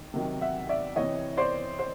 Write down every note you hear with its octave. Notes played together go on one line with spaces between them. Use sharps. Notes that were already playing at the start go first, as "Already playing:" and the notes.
Already playing: D#3
C3 D#3 F#3
E5 F#5
D5 E5
C3 E3 C#5 D#5
C5 D5
C5